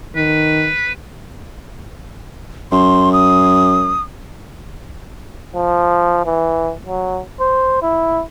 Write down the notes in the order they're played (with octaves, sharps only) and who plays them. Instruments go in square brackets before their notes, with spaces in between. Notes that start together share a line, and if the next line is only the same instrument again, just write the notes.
[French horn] D#3 [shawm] B4
[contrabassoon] F#2 [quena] C6
[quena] D#6
[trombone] F3
E3
F#3
C5
E4